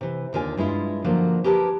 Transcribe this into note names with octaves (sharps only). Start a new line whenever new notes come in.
C3 E3
D#2 D3 F4 G#5
G2 G#3 E4 F4
D3 F3 F#3 A#3
G4 G#4 A#4 B4 A5